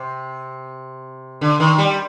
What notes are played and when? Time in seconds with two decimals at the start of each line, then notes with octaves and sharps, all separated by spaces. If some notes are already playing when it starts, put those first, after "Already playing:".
Already playing: C3
1.41 D3
1.60 D#3
1.78 G3